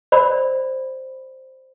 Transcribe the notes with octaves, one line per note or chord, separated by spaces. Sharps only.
C5 D5 B5